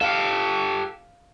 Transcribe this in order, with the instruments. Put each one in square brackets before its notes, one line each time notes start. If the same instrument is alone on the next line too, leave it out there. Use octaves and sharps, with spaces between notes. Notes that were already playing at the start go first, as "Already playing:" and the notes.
[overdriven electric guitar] G4 A4 [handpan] F5